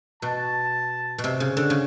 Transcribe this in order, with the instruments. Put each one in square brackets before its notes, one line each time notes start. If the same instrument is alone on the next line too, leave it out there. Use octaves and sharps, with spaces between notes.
[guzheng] B2 [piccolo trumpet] A5
[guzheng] B2
C3
C#3
D3
C#3